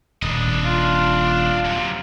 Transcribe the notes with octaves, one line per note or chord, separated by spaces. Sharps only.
D#1 D4 D#5
F4
F#2 C3